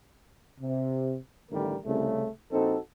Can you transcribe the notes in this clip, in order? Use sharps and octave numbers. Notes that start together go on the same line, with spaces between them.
C3
A1 D3 D#3 G3 A3 A#4
C2 C#3 A3
A#1 C4 D#4 F#4 A4